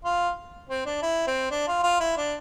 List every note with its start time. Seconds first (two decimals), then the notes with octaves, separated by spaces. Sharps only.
0.05 F4
0.70 C4
0.86 D4
1.02 E4
1.27 C4
1.51 D4
1.68 F4
1.83 F4
2.00 E4
2.17 D4